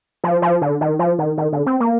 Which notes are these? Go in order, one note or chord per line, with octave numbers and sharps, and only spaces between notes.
F3
F3
D3
D#3
F3
D#3
D#3
D3
C4
A#3